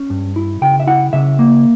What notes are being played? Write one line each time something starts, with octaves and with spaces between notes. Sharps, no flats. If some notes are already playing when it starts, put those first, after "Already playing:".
Already playing: C#4
G2
E4
C#3 G5
E5
E4 F#5
C#3 E5
A#3